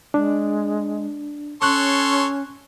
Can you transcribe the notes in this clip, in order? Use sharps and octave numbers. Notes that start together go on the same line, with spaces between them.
G#3 D4
C#4 A4 C#5 C6 C#6 F#6